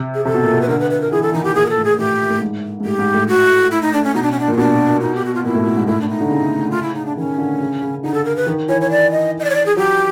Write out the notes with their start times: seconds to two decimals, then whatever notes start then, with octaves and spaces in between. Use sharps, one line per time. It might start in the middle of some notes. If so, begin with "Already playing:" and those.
Already playing: C3
0.14 G#4
0.25 C3 A4
0.34 B2
0.43 A#2
0.53 B2
0.61 B4
0.68 D3 A#4
0.80 B4
0.91 B4
1.01 A#4
1.12 E3 G#4
1.22 A4
1.34 D#3 D#4
1.44 G4
1.55 A#2 G#4
1.66 A#4
1.69 A4
1.77 A2
1.84 G#4
1.99 A2 G4
2.30 A2
2.41 G#2
2.80 G#2
2.85 A2 G4
2.99 G#2
3.14 A2
3.28 F#4
3.71 E4
3.82 D#4
3.93 D4
4.04 C#4
4.14 B2 D#4
4.23 D4
4.32 C#4
4.40 D4
4.48 A#2 D#4
4.58 B2 D4
5.01 D#4
5.15 G4
5.25 F#4
5.34 F4
5.44 A#2 E4
5.55 A2
5.66 A2
5.77 G#2
5.87 A2 E4
6.01 D4
6.09 D#4
6.21 D3
6.31 C#3
6.71 F4
6.83 E4
6.94 D#4
7.06 D4
7.17 D#3 C#4
7.38 D3
7.60 C#3
7.82 C#3
8.03 D3 D#4
8.14 A4
8.25 A#4
8.36 B4
8.47 D#3
8.68 E3 C#5
8.81 C#5
8.90 D5
9.11 D#5
9.40 D#5
9.44 D5
9.50 C#5
9.55 D5
9.66 G#4
9.77 F#3 G4